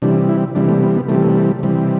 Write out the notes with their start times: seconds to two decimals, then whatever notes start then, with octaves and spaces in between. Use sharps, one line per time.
0.02 C3 E3 G3 D4
0.29 E4
0.55 C3 E3 G3 D4
0.69 A3
0.83 B3
0.96 B3
1.08 C3 E3 G3 A3
1.63 C3 E3 G3